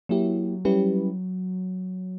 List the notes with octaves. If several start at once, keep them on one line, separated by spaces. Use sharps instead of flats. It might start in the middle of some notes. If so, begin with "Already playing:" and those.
F#3 A#3 E4 G4
G3 C#4 E4 G4 B4